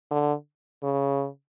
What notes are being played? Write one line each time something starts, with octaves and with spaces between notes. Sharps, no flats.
D3
C#3